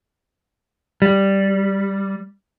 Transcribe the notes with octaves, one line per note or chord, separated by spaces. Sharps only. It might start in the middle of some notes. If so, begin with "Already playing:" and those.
G3